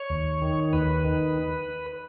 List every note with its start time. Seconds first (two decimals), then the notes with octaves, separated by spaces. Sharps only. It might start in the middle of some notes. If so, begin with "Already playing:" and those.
Already playing: C#5
0.10 D#2
0.42 D#3
0.73 D#2 B4
1.05 D#3